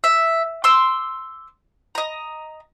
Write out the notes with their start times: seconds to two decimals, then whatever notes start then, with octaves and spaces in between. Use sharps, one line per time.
0.04 E5
0.64 C6 D6 E6
1.95 D#5 A#5